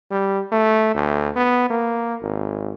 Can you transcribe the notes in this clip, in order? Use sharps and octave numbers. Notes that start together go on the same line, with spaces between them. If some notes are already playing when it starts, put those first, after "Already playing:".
G3
A3
D2
B3
A#3
G#1